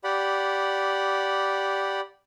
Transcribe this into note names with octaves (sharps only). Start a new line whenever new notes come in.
G4 D5 F#5 B5